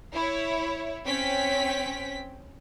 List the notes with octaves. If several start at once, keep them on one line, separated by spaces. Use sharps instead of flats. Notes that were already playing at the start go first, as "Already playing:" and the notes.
E4 C#5
C4 C#4 G5 B6